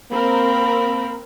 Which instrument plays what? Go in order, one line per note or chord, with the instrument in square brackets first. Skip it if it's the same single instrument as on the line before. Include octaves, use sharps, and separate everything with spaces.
[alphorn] A#3 [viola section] C4 A#4 [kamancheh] B5